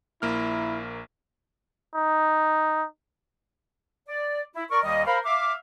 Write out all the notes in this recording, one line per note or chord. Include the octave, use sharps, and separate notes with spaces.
A#1 A#3 E4 F6
D#4
D5
E4
A#4 D5 C#6
D#2 D#3 G3 A#3 D#5
A#4 C5 F5 B5
E5 F5 D6